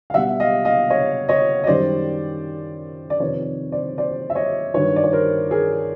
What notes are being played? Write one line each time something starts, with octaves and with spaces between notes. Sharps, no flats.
F5
B2 G3 E5 F#5
D#5 F5
D#5 F5
C#5 D#5
C#5 D#5
D#5
F#2 D#3 G3 C5 D5
D5
F2 C3 D#3 B4 C#5
C5 D5
C5 D5
E5
C#5 D#5
G2 D#3 F#3 B4 C#5
D5
C#5
A#4 C5
G#4 A#4